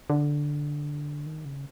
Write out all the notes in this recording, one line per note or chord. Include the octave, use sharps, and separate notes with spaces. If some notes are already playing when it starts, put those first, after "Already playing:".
D3
D#3
C#3